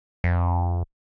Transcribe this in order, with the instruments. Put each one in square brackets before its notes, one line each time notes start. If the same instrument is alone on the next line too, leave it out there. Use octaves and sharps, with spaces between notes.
[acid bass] F2